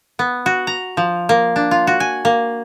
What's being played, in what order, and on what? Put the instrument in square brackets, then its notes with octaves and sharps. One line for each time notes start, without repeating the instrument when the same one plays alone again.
[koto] B3
F#4
A#5
F3
A#3
D4
F4
F#4
G#5
A#3